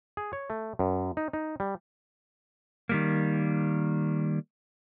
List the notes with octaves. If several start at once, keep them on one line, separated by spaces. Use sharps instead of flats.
G#4
C#5
A3
F#2
D#4
D#4
G3
D#3 G3 A#3